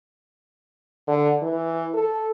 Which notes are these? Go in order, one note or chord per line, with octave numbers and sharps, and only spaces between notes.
D3
E3
A4